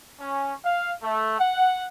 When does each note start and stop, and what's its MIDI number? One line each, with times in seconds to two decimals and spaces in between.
0.21 0.54 61
0.65 0.92 77
1.03 1.38 57
1.39 1.85 78